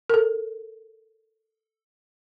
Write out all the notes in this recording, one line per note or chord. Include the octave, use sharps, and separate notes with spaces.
A4 A#4